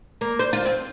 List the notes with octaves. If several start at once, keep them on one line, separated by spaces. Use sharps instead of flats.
A#3
C5
F4
C4